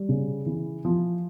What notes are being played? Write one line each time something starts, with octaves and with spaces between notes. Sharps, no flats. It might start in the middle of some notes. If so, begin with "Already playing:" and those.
Already playing: G3
C#3
E3
F3